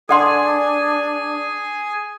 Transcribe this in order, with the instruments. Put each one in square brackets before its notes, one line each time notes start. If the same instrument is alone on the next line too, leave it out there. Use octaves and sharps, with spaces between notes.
[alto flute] D4 [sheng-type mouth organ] G#4 G#5 [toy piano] A4 F#5 C6